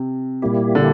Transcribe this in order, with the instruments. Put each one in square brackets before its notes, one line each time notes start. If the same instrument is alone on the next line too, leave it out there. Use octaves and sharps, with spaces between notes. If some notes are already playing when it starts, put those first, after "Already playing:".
Already playing: [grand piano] C3
[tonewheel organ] A#2 G3 A#3 E4 G4
[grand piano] D3